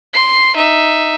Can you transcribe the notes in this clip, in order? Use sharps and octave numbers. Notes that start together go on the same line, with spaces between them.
C6 C7
D#4 E5